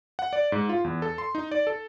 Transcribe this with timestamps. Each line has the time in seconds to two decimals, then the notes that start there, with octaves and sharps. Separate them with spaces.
0.19 F#5
0.33 D5
0.52 G#2
0.69 F4
0.84 E2
1.02 A4
1.18 C6
1.35 D#4
1.51 D5
1.67 A4